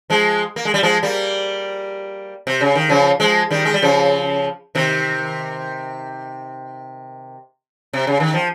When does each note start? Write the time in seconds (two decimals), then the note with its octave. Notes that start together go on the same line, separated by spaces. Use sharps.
0.10 F3 G#3
0.56 A#3
0.65 G#3
0.74 G3
0.83 F3 G#3
1.03 G3 A#3
2.47 C3
2.61 C#3
2.75 D#3
2.89 C#3 F3
3.20 F3 G#3
3.50 D#3 G3
3.65 G#3
3.74 G3
3.82 C#3 F3
4.75 C3 D#3
7.93 C3
8.07 C#3
8.20 D#3
8.34 F3